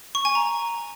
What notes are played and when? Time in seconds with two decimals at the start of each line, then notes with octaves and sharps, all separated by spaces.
0.15 C#6
0.25 G#5
0.35 A#5